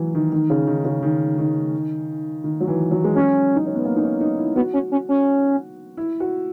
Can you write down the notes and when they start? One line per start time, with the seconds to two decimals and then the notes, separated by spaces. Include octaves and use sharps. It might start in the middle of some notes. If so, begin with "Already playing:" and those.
Already playing: E3 F#3
0.15 D#3
0.32 D#3
0.50 C#3
0.67 D#3
0.85 C#3
1.03 D#3
1.38 D#3
2.44 D#3
2.60 F#3
2.67 E3
2.91 F#3
3.04 G#3
3.15 F#3 C#4
3.56 D#4
3.65 C#4
3.75 B3
3.85 A#3
3.96 D#4
4.03 C#4
4.20 D#4
4.38 E4
4.56 B3 F#4
4.73 C#4
4.92 C#4
5.09 C#4
5.97 E4
6.20 F#4